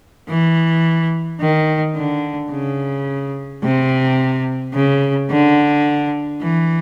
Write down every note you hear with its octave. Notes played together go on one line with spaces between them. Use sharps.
E3
D#3
D3
C#3
C3
C#3
D3
E3